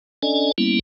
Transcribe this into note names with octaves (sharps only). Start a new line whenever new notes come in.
C#4 D4 A4 D5 D#5 G#5
G3 A#3 B3 C#4 E4